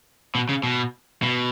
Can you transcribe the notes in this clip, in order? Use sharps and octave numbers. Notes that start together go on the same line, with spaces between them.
B2
C#3
B2
B2